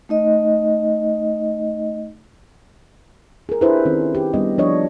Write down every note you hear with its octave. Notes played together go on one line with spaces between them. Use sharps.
A3 D#4 D#5
G#4 A#4
D4 E4 G4 G#4 B4 C5
D#3 C4 C#4
G4
G3 B3 C#4 D4 D#5
F3 D4 C#5 D#5